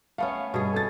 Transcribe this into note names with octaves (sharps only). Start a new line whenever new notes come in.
A3 B3 C#4 F5
G2 B2 G#4
A4 A6